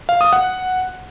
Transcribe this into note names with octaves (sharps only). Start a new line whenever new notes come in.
F5
D#6
F#5